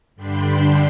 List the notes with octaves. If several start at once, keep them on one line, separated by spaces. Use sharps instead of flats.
G2 D3 D4 G5 B5 C6